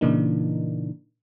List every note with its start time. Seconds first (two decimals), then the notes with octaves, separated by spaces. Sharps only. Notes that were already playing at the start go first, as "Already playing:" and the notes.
0.01 A#2 C#3 E3 A#3 D4 D#4